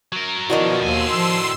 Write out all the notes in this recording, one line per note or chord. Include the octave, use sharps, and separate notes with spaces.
F#3 A#4
B2 D#3 F3 D4 E4 F#4
D#2 A2 G#5 C6 E6
F3